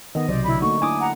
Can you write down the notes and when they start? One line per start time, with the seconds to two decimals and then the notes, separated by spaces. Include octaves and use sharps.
0.15 D#3 B3 D#5
0.28 B1 C3 F#3 C5 D5 D#5
0.45 D3 E4 B5
0.62 A3 A#3 D#4 F#4 C#6
0.82 D4 E4 G#5 D6 D#6
0.99 F#5 A#5